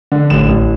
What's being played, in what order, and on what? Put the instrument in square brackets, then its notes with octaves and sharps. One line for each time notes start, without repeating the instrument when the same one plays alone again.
[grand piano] D3
A1 E7
A1